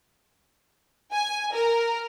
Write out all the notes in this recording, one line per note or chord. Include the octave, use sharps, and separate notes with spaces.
G#5
A#4